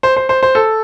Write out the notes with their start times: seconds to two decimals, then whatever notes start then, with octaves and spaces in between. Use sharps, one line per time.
0.03 C5
0.16 C5
0.29 C5
0.43 C5
0.55 A4